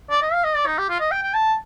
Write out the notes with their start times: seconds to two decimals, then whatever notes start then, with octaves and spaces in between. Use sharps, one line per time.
0.10 D5
0.22 D#5
0.33 F5
0.44 D#5
0.56 D5
0.66 D#4
0.78 G4
0.89 F4
1.00 D#5
1.11 G5
1.23 G5
1.34 A5